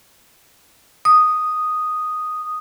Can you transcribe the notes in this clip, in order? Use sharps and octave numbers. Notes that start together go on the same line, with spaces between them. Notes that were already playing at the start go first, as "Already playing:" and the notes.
D#6